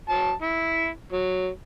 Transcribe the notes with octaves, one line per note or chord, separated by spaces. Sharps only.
F#3 A5
E4
F#3